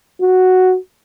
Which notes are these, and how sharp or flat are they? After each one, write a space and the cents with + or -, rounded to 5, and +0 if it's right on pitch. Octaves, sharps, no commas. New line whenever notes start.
F#4 +0